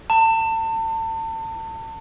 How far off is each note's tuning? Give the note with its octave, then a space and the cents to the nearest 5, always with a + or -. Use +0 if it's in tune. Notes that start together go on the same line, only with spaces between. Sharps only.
A5 +35